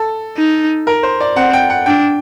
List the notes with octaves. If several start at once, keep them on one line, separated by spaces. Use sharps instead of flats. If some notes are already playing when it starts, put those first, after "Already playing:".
Already playing: A4
D#4
A#4
C5
D5
C4 F#5
G5
F#5
D4 G5